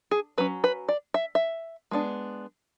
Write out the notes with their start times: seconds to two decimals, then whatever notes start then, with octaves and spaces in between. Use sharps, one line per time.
0.11 G#4
0.38 F#3 C#4 B4
0.64 B4
0.89 D5
1.14 E5
1.35 E5
1.91 G#3 B3 D4